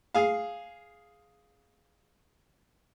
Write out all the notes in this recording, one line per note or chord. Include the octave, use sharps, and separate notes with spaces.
G#4 F5